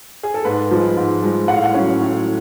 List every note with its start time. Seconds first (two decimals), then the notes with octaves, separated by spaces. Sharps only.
0.23 G#4
0.34 A4
0.44 G#2 B4
0.71 F3 G#3
0.97 G#2
1.23 F3 G#3
1.48 A2 F#5
1.56 F5
1.64 F#5
1.74 F#3 C#4
2.01 A2